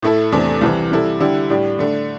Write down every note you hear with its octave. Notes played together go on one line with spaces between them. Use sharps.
A2 A3 E4 A4
E2 C3 A3 D4 A4
C2 C3 E3
C3 G3 E4 A4
D3 G3 E4 G4
A2 G3 D4 G4
D3 A3 D4